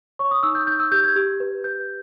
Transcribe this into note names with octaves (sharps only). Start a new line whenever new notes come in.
C#5 C#6
D#6
D#4 E6
G6
D#4 G6
E6
G4 G6
G#6
G4
B4
B4 G6